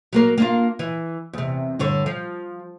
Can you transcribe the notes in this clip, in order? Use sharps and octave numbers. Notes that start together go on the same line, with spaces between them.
F#3 A#3 A#4
A#3 D4 F4
E3
E2 C3
G2 D3 C#5
F3